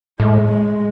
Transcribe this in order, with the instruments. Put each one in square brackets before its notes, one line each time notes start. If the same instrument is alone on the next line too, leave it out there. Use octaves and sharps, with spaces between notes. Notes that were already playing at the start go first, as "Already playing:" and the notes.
[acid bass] A2 [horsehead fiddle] G#3
[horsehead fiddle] G#3